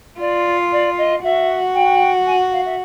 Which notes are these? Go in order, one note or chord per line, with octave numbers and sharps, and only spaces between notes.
F4 D5
D5
D#5
F#4 E5
G5
G#5
F5
E5